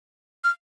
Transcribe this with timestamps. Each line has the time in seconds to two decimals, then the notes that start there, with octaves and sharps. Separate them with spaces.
0.44 F6